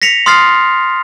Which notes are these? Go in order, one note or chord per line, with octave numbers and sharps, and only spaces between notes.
A#6 B6 C#7 F7
C6 D#6 F6 A6 C7